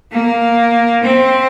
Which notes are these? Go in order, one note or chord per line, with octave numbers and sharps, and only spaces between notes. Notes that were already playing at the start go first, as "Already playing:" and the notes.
A#3
C4